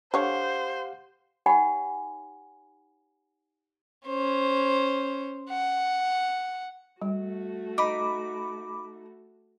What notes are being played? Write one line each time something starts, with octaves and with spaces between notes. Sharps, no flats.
D3 G4 C5 C#5 F5 F#5 A5
D#4 G4 C#5 F#5 G#5 B5
C#4 C5
F#5
G3 A3 F#4
D#4 B5 D6